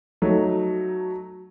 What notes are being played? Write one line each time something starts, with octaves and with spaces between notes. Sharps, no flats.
F#3 A3 D#4